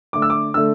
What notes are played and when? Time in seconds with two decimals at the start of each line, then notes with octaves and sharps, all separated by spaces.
0.13 D3 A3 D6
0.22 E6
0.30 D6
0.54 D3 A3 E6